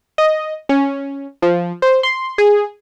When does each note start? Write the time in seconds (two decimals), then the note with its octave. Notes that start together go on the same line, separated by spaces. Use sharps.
0.18 D#5
0.69 C#4
1.42 F3
1.82 C5
2.03 C6
2.38 G#4